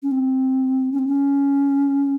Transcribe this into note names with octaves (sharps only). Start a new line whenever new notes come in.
C#4
C4
C#4
C4
C#4